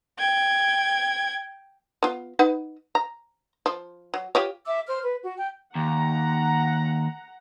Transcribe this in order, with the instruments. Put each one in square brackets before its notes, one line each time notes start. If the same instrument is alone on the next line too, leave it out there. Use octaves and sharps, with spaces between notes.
[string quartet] G5 G#6
[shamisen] B3 F4
D#4 B4 F#5
A#5
F3
F#3
F4 G4 C#5
[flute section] E5 D6 E6
C5 F6
B4
F#4
G5
[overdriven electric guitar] D#2 [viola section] F#5 A#5